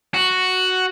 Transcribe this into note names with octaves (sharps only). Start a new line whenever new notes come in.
F#4